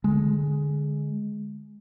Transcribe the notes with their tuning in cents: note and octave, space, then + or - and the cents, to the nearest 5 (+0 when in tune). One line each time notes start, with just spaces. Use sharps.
D3 +5 G#3 +0